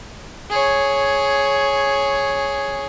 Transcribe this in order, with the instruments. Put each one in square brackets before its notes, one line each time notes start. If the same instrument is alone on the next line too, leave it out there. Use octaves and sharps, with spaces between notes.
[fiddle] G#4 C#5